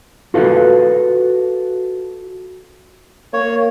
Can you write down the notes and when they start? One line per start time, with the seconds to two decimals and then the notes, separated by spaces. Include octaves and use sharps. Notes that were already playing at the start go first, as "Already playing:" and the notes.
0.34 F4 F#4 A4 B4 F5
3.33 A#3 C#5